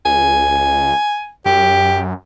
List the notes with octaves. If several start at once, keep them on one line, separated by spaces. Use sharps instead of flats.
C#2 G#5
F#2 G4